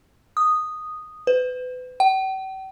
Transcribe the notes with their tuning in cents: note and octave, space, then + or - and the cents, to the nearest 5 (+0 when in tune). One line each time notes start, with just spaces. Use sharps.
D#6 -5
B4 +35
G5 -45